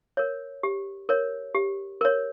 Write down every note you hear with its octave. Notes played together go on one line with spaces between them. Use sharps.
A#4 C#5
G4
A#4 C#5
G4
A#4 C#5